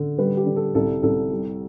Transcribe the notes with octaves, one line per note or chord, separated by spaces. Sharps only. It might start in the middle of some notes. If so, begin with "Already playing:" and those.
Already playing: D3
G3 B4
G4
D3
A4
C2 A4
C2 A4
G3